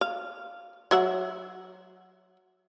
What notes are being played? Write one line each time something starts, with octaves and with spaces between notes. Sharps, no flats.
F5
F#3 E5 F#5